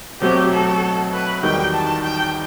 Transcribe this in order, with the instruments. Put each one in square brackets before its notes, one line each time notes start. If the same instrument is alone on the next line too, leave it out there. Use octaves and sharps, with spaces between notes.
[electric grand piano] B2 F#3 A3 C4 F#4 [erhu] G4
[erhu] A4
B4
[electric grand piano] E2 D#3 G3 D#4 F#4 [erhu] G5
[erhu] A5
G5